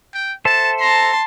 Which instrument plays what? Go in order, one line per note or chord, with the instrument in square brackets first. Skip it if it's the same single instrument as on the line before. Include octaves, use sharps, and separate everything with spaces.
[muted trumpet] G5
[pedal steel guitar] A4 C5 E5 [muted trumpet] A5
[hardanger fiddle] A5 C6 [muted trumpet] A#5